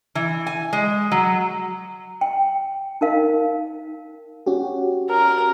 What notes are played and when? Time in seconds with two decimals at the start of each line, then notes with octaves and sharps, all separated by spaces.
0.15 E3
0.47 G#5
0.73 G#3
1.12 F#3
2.21 G5
3.01 D#4 A#4 F5
4.46 C#4 F#4 G4
5.10 A#4